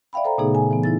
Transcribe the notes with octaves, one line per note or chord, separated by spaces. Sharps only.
D5 E5 F5 G5 B5
A4 C5 G5 A#5
A#2 C#3 A3 B3 D#4 G#4
G#5
E3 B3
D#4 E4 A6